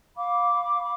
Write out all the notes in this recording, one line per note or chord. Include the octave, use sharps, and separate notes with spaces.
F5 B5 D6